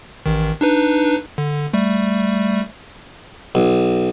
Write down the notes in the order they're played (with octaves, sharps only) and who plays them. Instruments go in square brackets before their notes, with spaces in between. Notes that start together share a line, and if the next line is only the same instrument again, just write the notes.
[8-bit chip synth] A1 D#3
D4 D#4 B4
D3
G3 A3
[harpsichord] B1